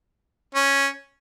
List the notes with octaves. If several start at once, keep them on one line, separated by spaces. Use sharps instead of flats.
C#4